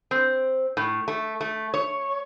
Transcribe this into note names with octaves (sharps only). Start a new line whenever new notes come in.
C4
A2
A3
A3
C#5